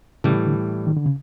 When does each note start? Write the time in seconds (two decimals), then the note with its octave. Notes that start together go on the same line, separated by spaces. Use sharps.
0.24 A2 C#3 E3 G3
0.45 D3
0.87 D#3
0.96 D3
1.06 C#3